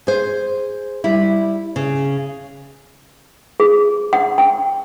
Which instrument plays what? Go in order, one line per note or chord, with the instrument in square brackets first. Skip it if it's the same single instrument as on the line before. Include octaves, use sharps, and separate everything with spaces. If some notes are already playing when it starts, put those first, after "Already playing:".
[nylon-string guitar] G#4 C5
G3 E4
C#3
[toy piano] G#4
F#5
G5